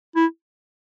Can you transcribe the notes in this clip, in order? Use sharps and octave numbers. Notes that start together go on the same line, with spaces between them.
E4